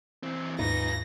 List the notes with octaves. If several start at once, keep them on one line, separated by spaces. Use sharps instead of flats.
E3 C4
D#2 G#2 D#4 F4 B4 A#6